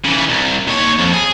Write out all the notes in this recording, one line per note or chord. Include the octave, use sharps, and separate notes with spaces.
C#3 E3
C2
D#2 C#5
F2
G#4